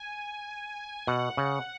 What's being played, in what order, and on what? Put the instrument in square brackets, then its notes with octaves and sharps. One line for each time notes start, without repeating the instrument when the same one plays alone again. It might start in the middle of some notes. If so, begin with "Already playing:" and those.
Already playing: [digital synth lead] G#5
[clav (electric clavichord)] B2 [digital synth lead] F#5
[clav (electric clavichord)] C#3